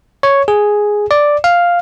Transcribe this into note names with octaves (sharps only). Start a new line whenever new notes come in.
C#5
G#4
D5
F5